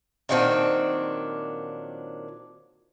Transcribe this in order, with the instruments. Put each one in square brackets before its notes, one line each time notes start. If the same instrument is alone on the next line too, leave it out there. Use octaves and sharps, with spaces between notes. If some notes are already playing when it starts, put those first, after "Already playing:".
[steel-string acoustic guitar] A#2 D#3 F#3 B3 C4 D4